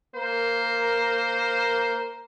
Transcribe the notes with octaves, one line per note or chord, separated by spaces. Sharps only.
A#3 A#4 C5